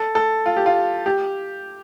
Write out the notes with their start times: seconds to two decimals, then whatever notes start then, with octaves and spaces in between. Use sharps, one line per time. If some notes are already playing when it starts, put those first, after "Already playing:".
Already playing: A4
0.15 A4
0.46 F4
0.57 G4
0.66 F4
1.06 G4